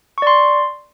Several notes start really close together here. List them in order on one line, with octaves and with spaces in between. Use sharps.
C#6 D5 C6